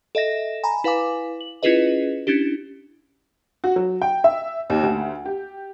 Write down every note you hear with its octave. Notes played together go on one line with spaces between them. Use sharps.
A4 D#5 E5 A#6 E7
G#5 A#5 B5
E4 B4 F5 G#5 D6
F#7
C#4 E4 F4 G#4 B4 D#5
C#4 D4 E4 G4
F#4
F#3
G5
E5
D#2
D2
G4